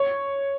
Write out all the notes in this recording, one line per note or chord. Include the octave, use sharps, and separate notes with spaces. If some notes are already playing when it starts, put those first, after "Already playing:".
Already playing: C#5